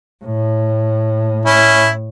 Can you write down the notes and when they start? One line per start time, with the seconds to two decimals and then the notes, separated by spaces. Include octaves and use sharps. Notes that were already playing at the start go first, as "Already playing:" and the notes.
0.25 A2
1.45 C#4 E4